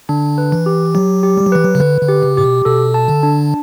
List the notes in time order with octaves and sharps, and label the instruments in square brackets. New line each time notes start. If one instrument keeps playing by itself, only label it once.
[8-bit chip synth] D3 [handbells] D4
[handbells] B4
[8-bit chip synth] E3
[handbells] G4
[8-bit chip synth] F#3 [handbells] G4
[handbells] G4
[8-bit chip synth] G3
F#3
[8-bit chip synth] E3 [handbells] B4
[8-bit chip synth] F#3
C#3
[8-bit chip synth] D3 [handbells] B4
[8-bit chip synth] D3
[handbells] G4
[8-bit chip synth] C#3
[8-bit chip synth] A2 [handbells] G4
[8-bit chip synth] B2
[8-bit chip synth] B2 [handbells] A4
[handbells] A5
[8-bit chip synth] D3
[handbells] D4